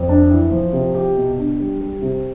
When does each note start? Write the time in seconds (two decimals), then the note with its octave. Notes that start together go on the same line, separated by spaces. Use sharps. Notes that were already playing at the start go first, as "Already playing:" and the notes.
Already playing: F2
0.09 D4
0.31 E3
0.51 F3
0.73 C3
0.95 G4
1.17 B2
1.38 D4
1.60 G3
1.81 G3
2.02 C3